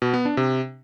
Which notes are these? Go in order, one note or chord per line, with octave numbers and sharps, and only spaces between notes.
B2
B3
D4
C3